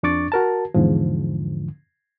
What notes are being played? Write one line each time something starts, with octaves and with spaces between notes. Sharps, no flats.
F2 D4 C#6 D6 A6
F#4 A#4 A5
E2 G#2 D3 F3